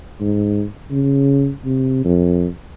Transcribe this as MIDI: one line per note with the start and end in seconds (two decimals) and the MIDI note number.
0.20 0.64 44
0.91 1.51 49
1.65 2.01 48
2.05 2.47 41